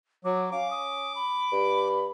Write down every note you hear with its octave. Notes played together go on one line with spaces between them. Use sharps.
F#3 D6
C#4 F5 D6
D#6
B5
G2